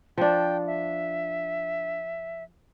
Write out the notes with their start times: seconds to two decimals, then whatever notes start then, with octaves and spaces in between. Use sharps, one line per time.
0.18 F3 D4 G5
0.67 E5